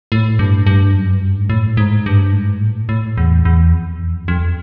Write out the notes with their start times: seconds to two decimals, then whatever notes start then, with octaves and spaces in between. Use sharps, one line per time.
0.12 A2
0.39 G2
0.67 G2
0.94 F#2
1.22 G2
1.40 G#2
1.50 A2
1.77 G#2
2.06 G2
2.33 G#2
2.61 A2
2.89 A2
3.18 E2
3.45 E2
3.73 F2
4.00 E2
4.14 F2
4.28 F2